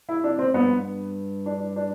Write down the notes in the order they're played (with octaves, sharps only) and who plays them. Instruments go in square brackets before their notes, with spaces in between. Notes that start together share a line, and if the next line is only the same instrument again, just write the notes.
[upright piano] E4
[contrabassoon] C3 [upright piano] D4
[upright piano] C4
[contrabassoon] G2 [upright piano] B3
[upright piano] D4
D4